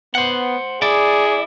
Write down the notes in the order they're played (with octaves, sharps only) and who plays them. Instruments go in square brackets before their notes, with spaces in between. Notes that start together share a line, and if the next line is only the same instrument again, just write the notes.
[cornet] B3 [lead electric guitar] C5 F#5
[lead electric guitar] E4 D5 [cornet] G#4